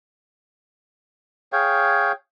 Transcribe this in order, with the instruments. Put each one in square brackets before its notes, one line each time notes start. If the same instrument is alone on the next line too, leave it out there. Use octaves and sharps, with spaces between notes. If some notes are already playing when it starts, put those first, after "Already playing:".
[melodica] G#4 C#5 F5 G5